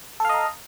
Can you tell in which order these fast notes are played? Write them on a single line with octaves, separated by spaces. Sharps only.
A4 F5 D#5 A#5